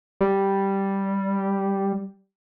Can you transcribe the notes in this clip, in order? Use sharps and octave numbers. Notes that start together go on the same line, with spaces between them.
G3